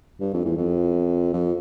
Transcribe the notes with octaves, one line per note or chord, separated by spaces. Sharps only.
G2
F2
E2
F2
F2